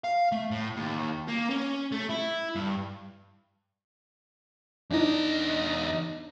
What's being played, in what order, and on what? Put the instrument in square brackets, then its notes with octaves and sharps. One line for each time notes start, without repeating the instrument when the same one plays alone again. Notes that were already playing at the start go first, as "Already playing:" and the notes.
[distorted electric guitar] F5
A3
A2
D#2
A#3
C#4
A3
E4
G2
[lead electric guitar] E2 D#5 [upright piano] D4 D#4